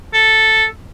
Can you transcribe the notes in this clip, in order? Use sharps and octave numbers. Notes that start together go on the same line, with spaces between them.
A4